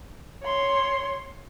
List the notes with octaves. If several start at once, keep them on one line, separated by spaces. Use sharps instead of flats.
C#5 C6